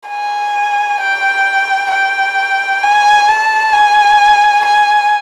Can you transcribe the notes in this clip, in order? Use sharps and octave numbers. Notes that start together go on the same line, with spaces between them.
G#5
G5
G5
G#5
A5
G#5
G#5